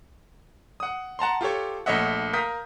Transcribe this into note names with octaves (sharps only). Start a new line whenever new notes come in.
F#5 D#6
F#5 A5 A#5 C6
F4 G4 A4 C#5
A#1 A3 C#5 D#5 E5 F#5
A#4 F5 D#6 G6 B6